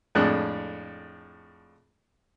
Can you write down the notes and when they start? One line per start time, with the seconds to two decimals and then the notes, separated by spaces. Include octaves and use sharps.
0.15 F2 A2 G#3 D4 F#6